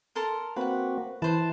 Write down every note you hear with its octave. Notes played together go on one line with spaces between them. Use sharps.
A4 A#4 C6
A#3 C4 F#4 B4 F#5
E3 E4 B4 C5 A5